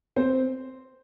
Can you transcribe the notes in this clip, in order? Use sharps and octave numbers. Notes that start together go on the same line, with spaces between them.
C4 C5